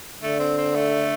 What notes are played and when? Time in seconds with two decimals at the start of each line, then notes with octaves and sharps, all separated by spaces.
0.22 D3 A3
0.39 C4
0.57 C4
0.75 A3